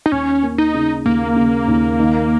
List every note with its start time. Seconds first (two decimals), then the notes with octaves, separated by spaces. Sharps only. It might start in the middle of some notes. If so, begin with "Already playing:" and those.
0.06 D#4
0.12 D#2 C#4
0.43 A#3
0.58 D#4
0.74 C#3
1.06 D#2 A#3
1.36 C#3
1.68 D#2
1.99 D#3